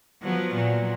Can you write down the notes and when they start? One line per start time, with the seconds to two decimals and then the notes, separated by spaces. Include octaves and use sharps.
0.22 F3 F#3 B3
0.54 A#2 F#3